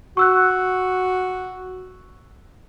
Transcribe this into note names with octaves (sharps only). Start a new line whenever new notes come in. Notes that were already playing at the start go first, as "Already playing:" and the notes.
F#4 C#6 E6 F#6